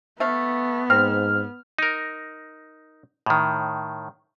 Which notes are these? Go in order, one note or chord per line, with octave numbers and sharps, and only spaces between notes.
A3 B3 F5
G#2 C4 F6
D#4 A#4
A2 D#3